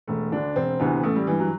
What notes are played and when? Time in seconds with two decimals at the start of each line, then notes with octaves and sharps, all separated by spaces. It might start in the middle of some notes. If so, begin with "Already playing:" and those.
0.08 E1 A3
0.31 D2 D3 D4
0.56 E1 C4
0.80 D2 C3 E3 B3
1.03 A1 A3
1.16 G3
1.27 G2 E3
1.40 F#3